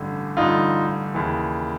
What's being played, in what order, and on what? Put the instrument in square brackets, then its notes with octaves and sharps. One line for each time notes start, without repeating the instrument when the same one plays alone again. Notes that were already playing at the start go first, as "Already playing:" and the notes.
Already playing: [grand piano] A1 G2 D3
A1 G2 D3 D#4 F4
D#2 C#3 E3